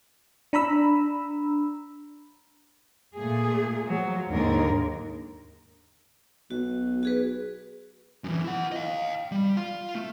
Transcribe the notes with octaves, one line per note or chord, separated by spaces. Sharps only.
D4 A#5 B5 E6
A#2 A3 G#4
F3 F#3
D#2 G#2 D3 G#3 A#4
B1 F#4
F#4 G#4 B4
F#2 E3
E4 F#5
D#5 F5
G3
F4 F5
A3